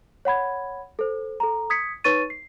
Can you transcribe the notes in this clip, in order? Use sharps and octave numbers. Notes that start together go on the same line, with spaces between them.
C#5 F#5 B5 G#6
A4 C5
A4 A#5
D#6 G#6 B6 C#7
D#4 B4 C#5 C#6 A6 D#7
C7